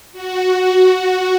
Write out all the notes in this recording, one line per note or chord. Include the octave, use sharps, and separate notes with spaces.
F#4